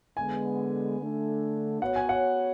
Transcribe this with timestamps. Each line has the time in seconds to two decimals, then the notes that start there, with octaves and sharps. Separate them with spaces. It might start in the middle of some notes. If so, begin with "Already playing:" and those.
0.17 D3 G#3 B3 G#5
0.99 D3 A3 D4
1.81 B3 F#4 C#5 F#5
1.96 G#5
2.09 F#5